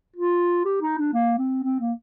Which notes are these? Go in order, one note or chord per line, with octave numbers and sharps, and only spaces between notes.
F4
G4
D#4
D4
A#3
C4
C4
A#3